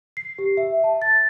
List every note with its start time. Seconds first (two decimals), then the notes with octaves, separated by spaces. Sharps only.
0.17 C7
0.38 G4
0.57 E5
0.84 A5
1.02 A6